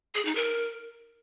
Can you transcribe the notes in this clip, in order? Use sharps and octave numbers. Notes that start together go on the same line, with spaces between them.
G#4
D#4
A#4